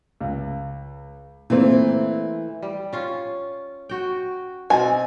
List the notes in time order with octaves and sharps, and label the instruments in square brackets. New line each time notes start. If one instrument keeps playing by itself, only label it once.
[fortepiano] C#2
[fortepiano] A#2 C4 [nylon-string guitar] E3 A3
[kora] G3
C#4 F4
F#4 G5
[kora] B2 C4 [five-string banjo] G#5